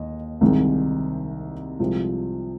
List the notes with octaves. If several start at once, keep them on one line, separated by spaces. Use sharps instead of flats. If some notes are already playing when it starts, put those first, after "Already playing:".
Already playing: D#2 D#5
C2 C3 D#3 G#3
C2 C3 F3 G#3